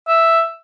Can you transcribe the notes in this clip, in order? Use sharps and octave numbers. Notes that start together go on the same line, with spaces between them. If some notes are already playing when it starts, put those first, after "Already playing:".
E5